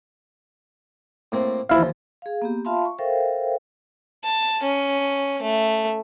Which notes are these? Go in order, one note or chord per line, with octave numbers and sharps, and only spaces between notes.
A2 A#3 C4
D#2 E3 F3 E4 F5
G#4 F5
A#3 B3 G4
F4 E5 F5 A5 B5 C6
C#6
A4 A#4 C5 E5 F5 G5
A5
C#4
A3